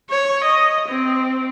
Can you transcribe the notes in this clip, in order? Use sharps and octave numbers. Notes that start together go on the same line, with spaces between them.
C#5
D#5
C4